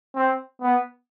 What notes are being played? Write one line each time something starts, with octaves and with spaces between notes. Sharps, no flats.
C4
B3